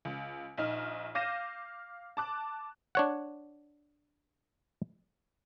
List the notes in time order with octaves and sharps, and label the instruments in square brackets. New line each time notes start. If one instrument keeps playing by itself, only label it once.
[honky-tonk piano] C#2
A#1 D#4 F6
F5 D6 G6 A#6 D#7 E7
A5 D6 F#6
[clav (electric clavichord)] D4 C#5 F#5